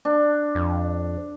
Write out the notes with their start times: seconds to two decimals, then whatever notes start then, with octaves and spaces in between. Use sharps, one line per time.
0.05 D4
0.55 F2